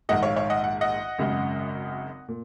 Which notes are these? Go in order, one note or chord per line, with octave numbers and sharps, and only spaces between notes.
A#1 G#2 D#3 D#5 F#5
C#5 F5
C#5 F5
D#5 F#5
F#5
D#5 F#5
G#1 F#2 C#3 G#3
A#2